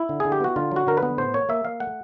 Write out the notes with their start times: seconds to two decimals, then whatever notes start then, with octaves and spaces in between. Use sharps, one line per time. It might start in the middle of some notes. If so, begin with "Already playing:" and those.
Already playing: E4
0.09 D3
0.20 D3 G#4
0.32 G4
0.40 B3 F#4
0.56 D3 F4
0.71 F#3 F#4
0.87 D3 A#4
0.97 B4
1.03 B3
1.17 A2 C5
1.34 A#3 C#5
1.49 A#3 E5
1.65 A#3 F5
1.80 A3 F#5